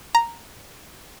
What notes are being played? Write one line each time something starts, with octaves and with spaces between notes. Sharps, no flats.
A#5